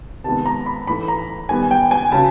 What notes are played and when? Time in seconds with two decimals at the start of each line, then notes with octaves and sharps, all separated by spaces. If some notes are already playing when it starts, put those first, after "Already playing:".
0.24 C3 D#3 G#3 B3 A5
0.46 A#5
0.66 B5
0.87 A2 E3 A3 B5
1.08 A#5
1.49 D#3 G3 B3 G#5
1.71 G5
1.91 G#5
2.12 C#3 F#3 A5